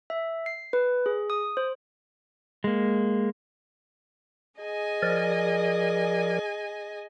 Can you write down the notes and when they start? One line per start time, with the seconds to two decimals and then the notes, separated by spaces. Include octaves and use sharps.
0.10 E5
0.46 C7
0.73 B4
1.06 G#4
1.30 D#6
1.57 C5
2.64 G#3 A#3
4.60 G#4 D#5 G#5
5.02 F3 A#4 D5